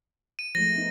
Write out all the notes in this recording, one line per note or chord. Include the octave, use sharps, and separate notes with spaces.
D#7
F3 G#3 A3 A#6
B3 D#4